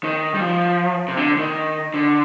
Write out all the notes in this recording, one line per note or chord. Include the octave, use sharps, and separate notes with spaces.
D#3
G3
F3
C3
D3
D#3
D3